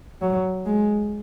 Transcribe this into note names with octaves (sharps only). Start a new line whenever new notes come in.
F#3
G#3